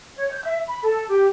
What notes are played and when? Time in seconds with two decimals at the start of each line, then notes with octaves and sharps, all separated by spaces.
0.17 C#5
0.32 G6
0.44 E5
0.67 B5
0.83 A4
1.10 G4